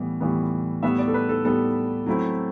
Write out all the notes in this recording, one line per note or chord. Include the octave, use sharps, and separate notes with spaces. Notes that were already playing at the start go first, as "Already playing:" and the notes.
Already playing: A2 E3 G3 B3
A2 E3 G3 B3
A2 G3 B3 E5
D5
A4
B4
A4
A2 G3 B3 A4
F#3 A3 C4 E4